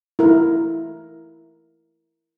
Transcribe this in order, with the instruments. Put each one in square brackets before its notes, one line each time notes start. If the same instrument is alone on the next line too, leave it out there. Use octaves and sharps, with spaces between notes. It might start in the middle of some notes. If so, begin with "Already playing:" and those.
[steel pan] E4 A#4